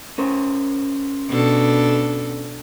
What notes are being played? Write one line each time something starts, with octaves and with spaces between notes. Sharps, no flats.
C#4 A#4 C5
B2 D4 A4